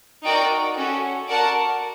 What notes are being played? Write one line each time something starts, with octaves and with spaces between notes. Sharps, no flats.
D#4 F#4 A#4 D5 G5
C#4 F#4 A4
F#4 A#4 D5 F#5 A5